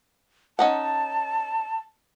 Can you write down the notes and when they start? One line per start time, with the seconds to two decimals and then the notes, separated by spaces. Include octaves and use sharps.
0.59 C#4 D#4 F#5 A5